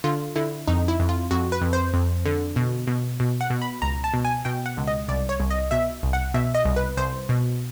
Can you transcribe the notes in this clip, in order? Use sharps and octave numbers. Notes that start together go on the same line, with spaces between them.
D3 F4
D3 E4
F2 D#4
E4
F2
F4
F2 F#4
B4
F2
C5
F2
D3
B2
B2
B2
F#5
B2
B5
C#2 A#5
A5
B2
G#5
B2 G5
F#5
C#2
D#5
C2 D5
C#5
C2
D#5
B2 E5
C2
F#5
B2 E5
D#5
C2
B4
C2 C5
B2